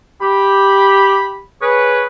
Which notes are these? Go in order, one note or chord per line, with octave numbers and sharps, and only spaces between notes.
G4 B5
G#4 B4 C#5